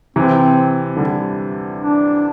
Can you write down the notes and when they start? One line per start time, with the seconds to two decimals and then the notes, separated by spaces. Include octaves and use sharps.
0.16 C3 E3 C4
0.97 D3 G3
1.78 D4